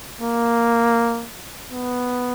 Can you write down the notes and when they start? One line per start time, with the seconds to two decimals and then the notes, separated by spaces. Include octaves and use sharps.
0.21 A#3
1.72 B3